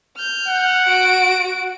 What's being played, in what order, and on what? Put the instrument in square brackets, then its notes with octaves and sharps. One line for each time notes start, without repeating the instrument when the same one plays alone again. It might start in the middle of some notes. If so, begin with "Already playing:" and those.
[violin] F6 G6
[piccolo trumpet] F#5
[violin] F#4 D7